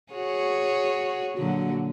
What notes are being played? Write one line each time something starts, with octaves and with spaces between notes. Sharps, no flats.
F#4 G#4 C#5
A#2 D3 F#3